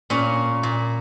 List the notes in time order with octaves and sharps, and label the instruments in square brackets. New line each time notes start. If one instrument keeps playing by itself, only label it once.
[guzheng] A#2 C#4
A#2